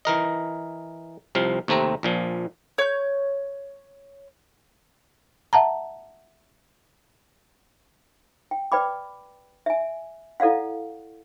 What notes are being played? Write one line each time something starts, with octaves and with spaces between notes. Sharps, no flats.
E3 A#4 D#5
C2 C3 F3 F5
D#2 C3 A3 C4 A#5
A#1 A#2 F3
C#5 G6
E5 F#5 A5 A#5
G5
B4 D5 G5 B5 D6
E5 G#5
E4 A4 D5 F5 F#5